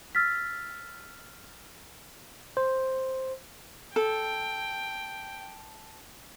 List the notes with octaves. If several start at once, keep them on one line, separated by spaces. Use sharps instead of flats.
E6 F6 A6 B6
C5
A4 G5